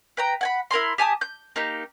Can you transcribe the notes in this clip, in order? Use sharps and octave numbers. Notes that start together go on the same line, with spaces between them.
B4 G5 A#5
F#5 G#5 B5
E4 A#4 B5 C6
G4 G#5 A5 D#6
G6
A#3 D#4 G4